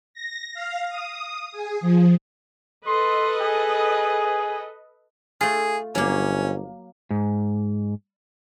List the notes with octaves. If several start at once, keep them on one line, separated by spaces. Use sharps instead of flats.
A#6
F5
D#6
G#4
F3
A4 B4 D#5 C6
G#4
A3 F4 G#4
G1 F#3 A#3 C#4
G#2